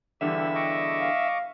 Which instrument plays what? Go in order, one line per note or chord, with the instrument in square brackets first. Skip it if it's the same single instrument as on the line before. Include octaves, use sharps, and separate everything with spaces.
[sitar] E2 G2 D3 [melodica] G4 [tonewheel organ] E5
[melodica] D#5 C#6 D6
[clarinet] F5